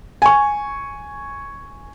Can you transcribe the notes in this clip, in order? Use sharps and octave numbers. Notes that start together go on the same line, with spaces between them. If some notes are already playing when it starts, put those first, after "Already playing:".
G#5 C#6